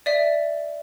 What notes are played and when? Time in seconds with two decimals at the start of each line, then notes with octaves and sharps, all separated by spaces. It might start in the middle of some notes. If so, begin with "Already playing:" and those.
0.06 D5 E5